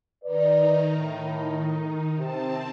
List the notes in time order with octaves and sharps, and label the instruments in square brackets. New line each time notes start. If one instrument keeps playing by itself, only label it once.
[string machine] D#3 D#4 [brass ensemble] B4 D5
[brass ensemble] A2
[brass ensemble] C3 [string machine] C4 A5